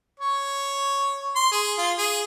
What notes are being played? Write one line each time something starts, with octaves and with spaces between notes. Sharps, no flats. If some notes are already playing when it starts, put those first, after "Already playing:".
C#5
C6
G#4
F4
G#4